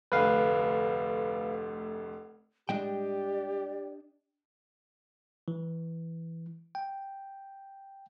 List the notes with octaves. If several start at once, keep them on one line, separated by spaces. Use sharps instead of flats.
F1 D2 B4 F5
A2 G3 G#3 D4 G4 D5 D#5 G5
E3
G5